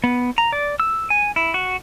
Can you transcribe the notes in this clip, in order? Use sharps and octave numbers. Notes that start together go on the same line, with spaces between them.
B3
A#5
D5
E6
G#5
E4
F#4